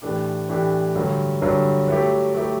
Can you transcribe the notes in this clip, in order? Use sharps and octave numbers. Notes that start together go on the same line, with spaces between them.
A2 E3 A3 D4 G4
A2 E3 A3 D4 G4
G2 D3 F#3
G2 D3 F#3
F#3 A3 E4 G4
F#3 A3 E4 G4